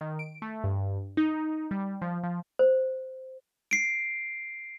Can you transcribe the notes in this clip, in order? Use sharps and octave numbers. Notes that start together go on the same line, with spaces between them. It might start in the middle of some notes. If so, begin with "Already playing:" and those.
D#3
D7
A3
G2
D#4
G3
F3
F3
C5
C7 D7